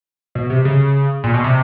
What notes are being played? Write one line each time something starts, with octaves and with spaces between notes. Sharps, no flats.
B2
C3
C#3
A#2
B2
C3